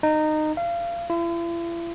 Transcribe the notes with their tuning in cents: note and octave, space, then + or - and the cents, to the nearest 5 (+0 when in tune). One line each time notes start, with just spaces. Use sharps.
D#4 -20
F5 -30
E4 +45